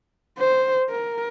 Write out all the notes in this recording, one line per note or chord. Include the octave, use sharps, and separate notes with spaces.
C5
A#4